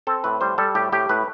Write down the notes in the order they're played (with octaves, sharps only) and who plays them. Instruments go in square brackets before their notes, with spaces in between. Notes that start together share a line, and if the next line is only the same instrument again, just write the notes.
[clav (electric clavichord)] C4 A4
A2 B4
G3 C5
G3 A4
A2 G4
A2 G4
A2 B4